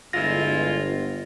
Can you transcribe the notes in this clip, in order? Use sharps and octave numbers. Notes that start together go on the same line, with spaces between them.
G1 G#3 E4 F4 A#6